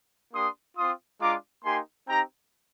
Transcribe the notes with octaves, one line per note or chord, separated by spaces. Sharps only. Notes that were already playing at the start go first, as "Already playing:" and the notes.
A#3 D4 G4 C6 D#6
C4 F4 C6 D#6
G#3 D4 F4 A#5 D6
A#3 D#4 G4 G#5 C6
C4 D#4 G4 G5 A#5